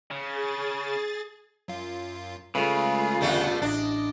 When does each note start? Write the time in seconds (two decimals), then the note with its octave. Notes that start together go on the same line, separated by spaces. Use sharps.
0.11 C#3 G#4 A6
1.68 F#2 F4
2.55 C#3 G#3 A3 F4 G#4 B4
3.21 E2 A#2 D3 G3 A3 F#5
3.62 A1 D4 D#5